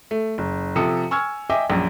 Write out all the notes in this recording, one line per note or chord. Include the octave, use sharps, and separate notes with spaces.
A3
F#1
C3 F3 A4 D#6 C#7
G#5 C#6 E6 F6 G#6
D#5 E5 G5 G#5 D6
A#1 F#2